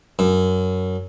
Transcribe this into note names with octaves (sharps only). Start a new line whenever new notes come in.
F#2